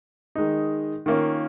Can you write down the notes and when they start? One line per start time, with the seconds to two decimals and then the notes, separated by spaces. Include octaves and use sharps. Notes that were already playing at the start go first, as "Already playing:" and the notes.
0.35 D#3 G#3 D#4
1.06 D#3 A#3 C#4 F4